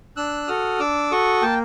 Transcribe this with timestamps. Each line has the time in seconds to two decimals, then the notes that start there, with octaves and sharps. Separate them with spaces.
0.16 D4 E6 F#6
0.48 F#4 A4 D#6 F6
0.80 D4 D6 E6
1.11 F#4 A4 C#6 D#6
1.42 A#3 G5 A5